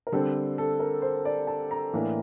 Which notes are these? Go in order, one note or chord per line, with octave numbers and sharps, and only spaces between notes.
A#4
D3 G3 C4 A4
A4
A#4
C5
D5
A5
A#5
A2 E3 A#3 D4